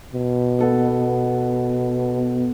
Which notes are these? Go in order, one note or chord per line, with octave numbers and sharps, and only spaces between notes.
B2
B3 A4 D#5